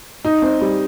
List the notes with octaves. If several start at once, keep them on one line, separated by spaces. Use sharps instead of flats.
D#4
C4
G3